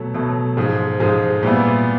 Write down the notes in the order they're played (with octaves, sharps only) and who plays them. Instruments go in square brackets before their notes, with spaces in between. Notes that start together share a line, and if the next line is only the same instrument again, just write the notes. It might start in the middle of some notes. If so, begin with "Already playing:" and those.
Already playing: [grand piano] B2 F#3 A3
B2 F#3 A3
G#2 F3 G#3
G#2 F3 G#3
A#2 G3 B3 E4